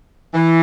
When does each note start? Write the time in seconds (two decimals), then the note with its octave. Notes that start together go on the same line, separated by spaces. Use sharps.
0.34 E3